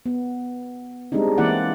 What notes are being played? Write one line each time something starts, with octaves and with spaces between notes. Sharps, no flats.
B3
G3 G#3 C4 D4 D#4
E3 A#3 C4 E4 D5 F#5